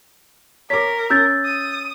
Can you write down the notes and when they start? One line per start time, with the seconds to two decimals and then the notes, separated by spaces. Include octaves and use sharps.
0.70 A#4 C#5 D6 B6
1.10 C#4 E6 G6 A6
1.45 D#6